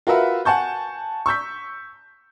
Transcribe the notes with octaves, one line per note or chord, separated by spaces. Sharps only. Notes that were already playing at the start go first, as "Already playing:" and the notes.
F4 F#4 A#4 B4 E5 F#5
F#5 G#5 A5 C#6 G6
C#6 E6 G6 B6